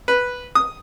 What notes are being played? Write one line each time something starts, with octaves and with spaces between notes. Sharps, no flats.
B4
D#6